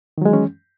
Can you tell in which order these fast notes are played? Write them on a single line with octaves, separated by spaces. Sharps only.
D#3 F#3 G#3 E3 C#4